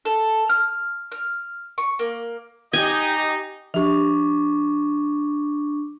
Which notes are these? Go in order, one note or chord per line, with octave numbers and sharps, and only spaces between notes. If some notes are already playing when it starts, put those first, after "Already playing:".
A4
F6
F6
C#6
A#3
D#4 G4 D#5 G#5
F3 D4 G4 C#6 D6